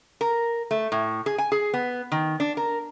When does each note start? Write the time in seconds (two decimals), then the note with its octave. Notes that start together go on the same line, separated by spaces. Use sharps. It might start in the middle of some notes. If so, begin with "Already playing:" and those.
0.21 A#4
0.71 A3
0.92 A2
1.26 G#4
1.38 G#5
1.52 G#4
1.74 B3
2.12 D#3
2.40 D4
2.57 A#4